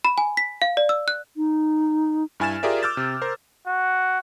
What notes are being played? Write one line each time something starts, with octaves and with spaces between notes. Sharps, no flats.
B5
G#5
B6
F5
D5
E6
F#6
D#4
G2 E4 G#5 F6 A6 E7
F4 G4 G#4 A#4 D5 E5
D6 E6 F6 G6 A6 E7
C3
A#4 C5
F#4